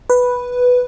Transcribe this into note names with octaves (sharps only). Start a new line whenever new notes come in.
B4